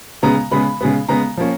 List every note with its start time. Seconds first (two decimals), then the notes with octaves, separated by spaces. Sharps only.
0.23 C#3 G#3 B3 A#5
0.51 C#3 G#3 B3 B5
0.81 C#3 G#3 B3
1.08 C#3 G#3 B3 A#5
1.37 F3 A#3 C#4